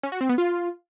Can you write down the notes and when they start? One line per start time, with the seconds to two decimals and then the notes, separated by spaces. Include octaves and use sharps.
0.03 C#4
0.12 F#4
0.21 C4
0.29 B3
0.38 F4